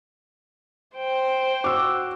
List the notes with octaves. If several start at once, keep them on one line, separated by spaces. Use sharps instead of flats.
C5 G5
F#4 D6 E6